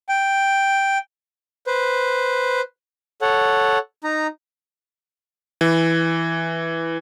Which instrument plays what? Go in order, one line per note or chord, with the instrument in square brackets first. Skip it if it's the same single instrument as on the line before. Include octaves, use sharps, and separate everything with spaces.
[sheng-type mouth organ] G5
B4 C5
A4 C#5 F#5
D#4 A#5
[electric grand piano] E3